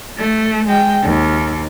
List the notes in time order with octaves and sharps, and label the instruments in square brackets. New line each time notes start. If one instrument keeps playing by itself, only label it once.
[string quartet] A3
G#3 G5
D#2